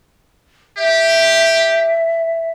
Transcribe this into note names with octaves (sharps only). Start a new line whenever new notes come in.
G4 E5